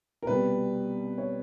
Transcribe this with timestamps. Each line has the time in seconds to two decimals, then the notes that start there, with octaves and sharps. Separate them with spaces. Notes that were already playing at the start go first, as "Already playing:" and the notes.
0.23 A#4
0.26 C2 B2 G3 B4
1.18 C#5